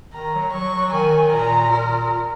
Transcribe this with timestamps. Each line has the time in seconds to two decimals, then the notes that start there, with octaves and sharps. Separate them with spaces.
0.14 D#3 A#5
0.34 F#3
0.53 F#3 C#6
0.73 F#3
0.93 D#3 G#5
1.33 A#2 A#5
1.72 A#2 A#4